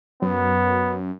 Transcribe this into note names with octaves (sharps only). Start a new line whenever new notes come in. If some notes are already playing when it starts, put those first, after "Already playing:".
F#2 B3